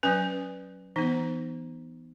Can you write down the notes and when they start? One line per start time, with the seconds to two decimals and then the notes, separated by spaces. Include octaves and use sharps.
0.03 F#3 C#4 B4
0.96 E3 B3 D#4